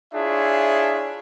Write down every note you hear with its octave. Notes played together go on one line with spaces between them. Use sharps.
D4 E4 F4 G#4 C#5 E5